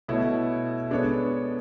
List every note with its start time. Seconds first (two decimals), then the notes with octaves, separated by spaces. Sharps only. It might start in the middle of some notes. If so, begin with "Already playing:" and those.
0.08 B2 A3 E4 A4 C#5
0.90 G#3 B3 D4 A4 C#5